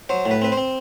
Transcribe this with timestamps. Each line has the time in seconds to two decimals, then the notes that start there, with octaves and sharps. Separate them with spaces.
0.09 F#3 C5
0.25 A2
0.31 B4
0.42 C4 B4
0.52 C5
0.57 C4